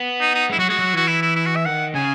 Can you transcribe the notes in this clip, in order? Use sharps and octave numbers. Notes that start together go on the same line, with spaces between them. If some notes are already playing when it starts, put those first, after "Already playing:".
Already playing: B3
D#4
D#4
G#3 E4
F#3 F#4
G#3 F#4
F#3
E3 F#4
E4
E4
E4
F#4
E5
D#3 F#5
C#3 G#5